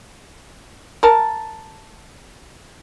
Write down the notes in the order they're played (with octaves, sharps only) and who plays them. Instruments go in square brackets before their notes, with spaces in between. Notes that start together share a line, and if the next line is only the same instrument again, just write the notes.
[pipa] A#4 A5